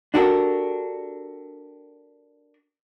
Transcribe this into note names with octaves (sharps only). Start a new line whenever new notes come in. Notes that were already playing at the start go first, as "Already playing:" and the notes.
D4 F#4 G4 A4 A#4